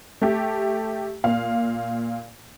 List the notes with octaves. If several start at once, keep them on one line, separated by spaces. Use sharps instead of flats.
A3 G4
A#2 F5